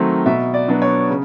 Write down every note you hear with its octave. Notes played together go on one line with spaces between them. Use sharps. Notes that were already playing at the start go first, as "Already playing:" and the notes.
Already playing: D#3 F#3 A3 C4
B2 E5
D5
F#3 B3 D4
C#5
C#3